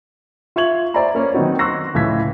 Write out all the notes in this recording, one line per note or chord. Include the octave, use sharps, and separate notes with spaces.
F4 E5 C#6 G#6 F#7
C5 D5 E5 G#5 A#5 B5
A#3 C#4
D#3 F#3 B3 C4 D#4 F#4
C6 C#6 E6 F#6 A#6 C7
C#2 A2 E3 G#6 B6